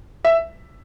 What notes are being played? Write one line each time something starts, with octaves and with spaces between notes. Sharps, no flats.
E5